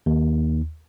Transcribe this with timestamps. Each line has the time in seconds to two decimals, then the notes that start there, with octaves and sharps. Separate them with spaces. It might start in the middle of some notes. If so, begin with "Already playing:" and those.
0.06 D#2